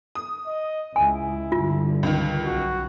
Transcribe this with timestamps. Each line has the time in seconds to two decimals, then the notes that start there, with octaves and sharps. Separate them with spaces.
0.15 D#6
0.47 D#5
0.96 C#2 E4 G#5
1.52 G2 D3 F4
2.03 C#2 D#3
2.45 B1 F#4